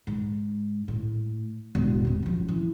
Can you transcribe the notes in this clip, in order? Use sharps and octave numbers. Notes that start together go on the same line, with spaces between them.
G#2
A2
E1 A1
G#2 C3
F#1 F3
E3